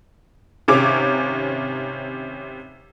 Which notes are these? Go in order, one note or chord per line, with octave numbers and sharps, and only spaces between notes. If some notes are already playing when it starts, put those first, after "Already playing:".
G#1 C3 C#4 D6 G#6 F7